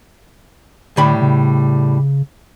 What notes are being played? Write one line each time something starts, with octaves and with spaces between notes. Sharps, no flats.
A2 D3 G3 B5
C#3